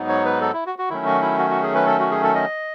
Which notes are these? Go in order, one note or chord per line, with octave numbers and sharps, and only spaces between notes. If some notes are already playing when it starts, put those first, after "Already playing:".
Already playing: G#2 F#3 B3 D#4
C#5
B4
A4
E4
F#4
F#4
D#3 F#3 A3 C#4 E4
F#4
E4
F#4
F#4
G#4
B4
A4
F#4
G#4
A4
D#5